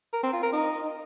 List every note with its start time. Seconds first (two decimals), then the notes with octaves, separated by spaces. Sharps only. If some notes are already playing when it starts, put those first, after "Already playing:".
0.13 A#4
0.23 C4
0.33 F4
0.43 A#4
0.53 D#4